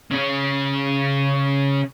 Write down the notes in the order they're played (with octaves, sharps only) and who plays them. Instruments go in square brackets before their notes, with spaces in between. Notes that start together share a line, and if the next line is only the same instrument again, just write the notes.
[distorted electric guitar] C#3 C#4